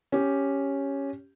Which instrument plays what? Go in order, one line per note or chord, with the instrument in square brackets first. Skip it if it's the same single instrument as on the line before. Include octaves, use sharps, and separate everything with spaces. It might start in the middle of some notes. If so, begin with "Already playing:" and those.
[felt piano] C#4 G4